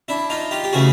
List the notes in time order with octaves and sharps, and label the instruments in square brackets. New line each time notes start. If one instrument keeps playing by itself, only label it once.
[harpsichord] D4 E4
D#4 F4
F4 G4
G4
C#3 E3 A3 F#4 G#4